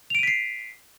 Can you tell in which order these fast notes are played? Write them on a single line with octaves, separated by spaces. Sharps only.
F7 D7 D#7 B6 C7